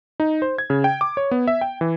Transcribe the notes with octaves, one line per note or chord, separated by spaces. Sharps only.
D#4
C5
G#6
C#3
G5
D6
C#5
B3
E5
G5
E3